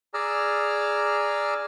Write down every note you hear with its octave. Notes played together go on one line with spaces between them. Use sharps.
G#4 D5 A#5 E6 F6